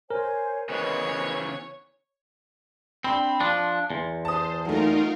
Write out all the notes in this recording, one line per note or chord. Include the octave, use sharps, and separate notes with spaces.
A#4 C5 C#5 G#5
C#3 E3 B3 C5 C#5 D#5
C4 D4 B5
F3 D4 C6
E2
C5 A5 D#6
F#3 A3 D#4 F4 A#4